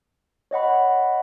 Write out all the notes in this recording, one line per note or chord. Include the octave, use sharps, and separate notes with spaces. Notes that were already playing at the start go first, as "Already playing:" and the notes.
C#5 D#5 F#5 B5